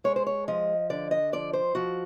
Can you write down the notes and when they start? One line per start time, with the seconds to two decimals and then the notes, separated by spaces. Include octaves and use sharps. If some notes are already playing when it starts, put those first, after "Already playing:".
0.04 G#3 C#5
0.16 C5
0.27 C#5
0.48 F3 D#5
0.90 D3 D5
1.11 D#5
1.33 F3 D5
1.53 C5
1.75 F3 F#4